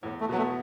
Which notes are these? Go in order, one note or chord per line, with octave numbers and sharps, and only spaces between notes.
E2 A2
A3
B2 F#3 B3
A3